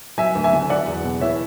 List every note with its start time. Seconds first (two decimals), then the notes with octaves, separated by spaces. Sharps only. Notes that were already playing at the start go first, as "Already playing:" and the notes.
0.18 F#3 E5 G#5
0.35 D2
0.44 E5 G#5
0.53 D3
0.70 F#3 D5 F#5
0.87 E2
1.04 B2
1.21 E3 C#5 E5